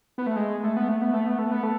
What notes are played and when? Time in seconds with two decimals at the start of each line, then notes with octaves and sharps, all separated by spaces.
0.18 B3
0.27 A3
0.36 G#3
0.64 A3
0.77 B3
0.88 A3
1.02 B3
1.14 A3
1.26 B3
1.39 A3
1.51 B3
1.63 A3